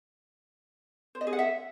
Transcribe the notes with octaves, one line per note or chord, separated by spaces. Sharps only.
C5
D#5
G#4
F#5
E5